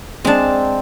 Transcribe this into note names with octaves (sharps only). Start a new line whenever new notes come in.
G#3 C4 D4 A5